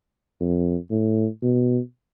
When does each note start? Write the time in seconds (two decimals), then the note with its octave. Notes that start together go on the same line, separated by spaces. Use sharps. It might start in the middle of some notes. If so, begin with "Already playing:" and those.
0.40 F2
0.91 A2
1.43 B2